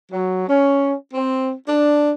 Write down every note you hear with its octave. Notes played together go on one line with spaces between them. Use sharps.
F#3
C#4
C4
D4